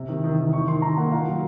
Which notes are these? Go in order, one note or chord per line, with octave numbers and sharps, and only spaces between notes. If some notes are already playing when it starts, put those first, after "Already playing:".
Already playing: C3
D#3
D#3
D#3
D#3 C#6
D#3 C6
D#3 A#5
A#3 F#5
A#2 F5
F#3